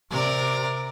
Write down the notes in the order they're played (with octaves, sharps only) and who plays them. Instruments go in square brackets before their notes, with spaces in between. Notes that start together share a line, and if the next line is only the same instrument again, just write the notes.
[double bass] C3 [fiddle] A#4 D5